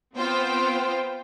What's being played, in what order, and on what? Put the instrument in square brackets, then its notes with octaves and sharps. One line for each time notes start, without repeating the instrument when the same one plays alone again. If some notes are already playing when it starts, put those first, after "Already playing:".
[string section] B3 C4 F4 C5 G5